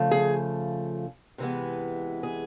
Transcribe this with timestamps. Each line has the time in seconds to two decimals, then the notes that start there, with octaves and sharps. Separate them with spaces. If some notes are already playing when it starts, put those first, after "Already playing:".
Already playing: C#3 F3 A3
0.11 G#4
1.38 C3 E3 G#3 B3
2.23 G#4